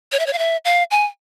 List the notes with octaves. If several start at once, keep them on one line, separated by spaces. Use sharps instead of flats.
C#5
E5
C#5
F5
E5
F5
G#5